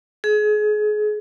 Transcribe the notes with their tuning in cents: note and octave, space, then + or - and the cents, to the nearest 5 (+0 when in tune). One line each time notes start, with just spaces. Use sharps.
G#4 +30